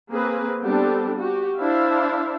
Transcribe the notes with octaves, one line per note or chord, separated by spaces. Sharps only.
A#3 C4 G#4 B4
G3 B3 C4 D4 G4 A4
F#4 G4
D4 E4 C5 E5 F5